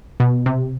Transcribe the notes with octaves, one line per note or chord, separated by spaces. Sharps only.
B2
C3